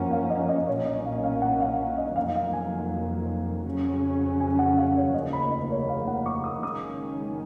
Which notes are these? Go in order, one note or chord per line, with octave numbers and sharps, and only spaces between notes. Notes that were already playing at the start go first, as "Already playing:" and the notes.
Already playing: F#2 F3 A#3 C#4 F#5 G#5 A#5
F5
D#5
D#5
B1 A#2 F#3 A#3 C#4 C#5
D#5
F5
F5
F#5
F5
D#5
F1 F2 D#3 F#3 A#3 F5
F5
G#5
F2 C#3 F#3 C#4
G#5
F#5
F5
C#5
F1 D#2 C#3 F3 A#3 D#5
B5
D#5
C#5
F5
F#5
C#6
D#6
F#1 F#2 D#3 G#3 C#4 D#6